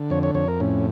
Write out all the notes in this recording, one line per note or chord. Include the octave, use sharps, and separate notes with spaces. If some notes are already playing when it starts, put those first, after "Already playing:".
Already playing: D3
F2 C#5
C#5
F2 C#5
A#4
A2 C#4